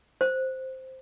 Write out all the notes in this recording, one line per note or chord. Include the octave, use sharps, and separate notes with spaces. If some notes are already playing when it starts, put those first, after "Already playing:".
C5